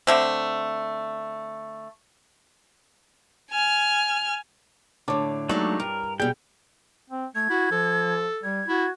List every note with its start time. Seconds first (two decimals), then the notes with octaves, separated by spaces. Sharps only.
0.07 D3 A3 C4
3.50 G#5 F6
5.08 A2 D3 C#5 A5 D6
5.49 D#2 F#3 G#3 A3 D4 D#4
5.80 G2 A#4
6.20 B2 G3 G#4 G5
7.10 C4
7.35 A3 G#6
7.50 E4 F#4
7.71 F3 A4
8.43 G3 G#6
8.68 E4 F#4